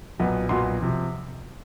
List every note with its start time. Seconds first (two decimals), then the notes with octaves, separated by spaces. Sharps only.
0.19 B1 A#2 F#3 B3
0.49 B1 A#2 F#3 B3 C6
0.80 C3 F3